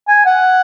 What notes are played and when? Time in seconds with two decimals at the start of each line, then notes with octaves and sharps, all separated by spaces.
0.08 G#5
0.26 F#5